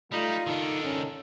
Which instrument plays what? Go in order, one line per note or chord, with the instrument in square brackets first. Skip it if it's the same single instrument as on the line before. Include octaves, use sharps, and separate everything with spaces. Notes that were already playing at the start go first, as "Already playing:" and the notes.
[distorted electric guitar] G3 [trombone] A3 [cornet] D#4 [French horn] F4
[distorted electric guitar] D#3 D4 [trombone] D#4 [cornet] A4
[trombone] C#4 [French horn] D#4